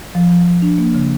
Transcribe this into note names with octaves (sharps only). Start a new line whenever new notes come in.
F3
F3
F3
D4
A#3
C#3